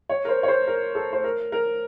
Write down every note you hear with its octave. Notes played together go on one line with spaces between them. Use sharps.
C#5
A#4
C5
C#5
C5
A#4
A4
C5
A#4
A#4